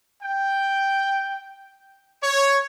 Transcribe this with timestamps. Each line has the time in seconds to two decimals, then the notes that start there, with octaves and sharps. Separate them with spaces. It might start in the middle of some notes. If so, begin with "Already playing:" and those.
0.22 G5
2.22 C#5